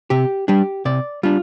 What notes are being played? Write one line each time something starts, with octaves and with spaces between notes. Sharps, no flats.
C3 G4
G3 D4 G4
C3 D5
G3 D4 F4